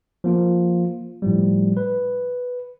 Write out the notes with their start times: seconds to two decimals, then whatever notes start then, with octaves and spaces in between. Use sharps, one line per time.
0.24 F3 A#3 F4
1.22 A2 F3 G3
1.77 B4